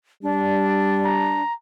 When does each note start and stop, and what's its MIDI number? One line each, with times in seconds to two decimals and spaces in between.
0.23 1.44 55
0.23 1.42 62
1.05 1.54 82